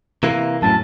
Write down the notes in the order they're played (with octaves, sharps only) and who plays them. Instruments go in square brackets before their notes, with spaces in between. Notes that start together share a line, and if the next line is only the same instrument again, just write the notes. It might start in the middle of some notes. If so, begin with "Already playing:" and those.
[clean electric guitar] C3 E3 A#3
[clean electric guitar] F#2 A2 [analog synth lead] A5